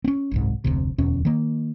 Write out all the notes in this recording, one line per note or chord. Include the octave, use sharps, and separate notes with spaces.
C4 C#4
F#1 C2 G#2
F1 D2 C3
D1 E2 B2 C#4
D#3 A#3